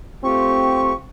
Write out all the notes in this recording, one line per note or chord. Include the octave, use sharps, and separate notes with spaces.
A3 C4 F4 G4 C#6